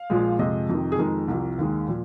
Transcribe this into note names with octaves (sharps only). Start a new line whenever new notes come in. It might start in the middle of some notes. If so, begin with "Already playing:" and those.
Already playing: F5
A#1 A#2 F3 G#3
F2 C3 F3 G#3 D#5
F2 C3 D#3
G#4
F2 D#3 G#3 A#4
C2 C3 F3
D#2 D#3 G#3
A#2 F3